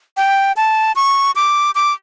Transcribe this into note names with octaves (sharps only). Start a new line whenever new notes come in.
G5
A5
C#6
D6
D6